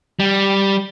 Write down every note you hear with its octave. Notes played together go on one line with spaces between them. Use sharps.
G3